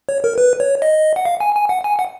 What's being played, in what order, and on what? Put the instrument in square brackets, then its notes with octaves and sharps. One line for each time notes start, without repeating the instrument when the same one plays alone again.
[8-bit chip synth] C#5
A#4
B4
C#5
D#5
F#5
F5
G#5
G#5
F#5
G#5
F#5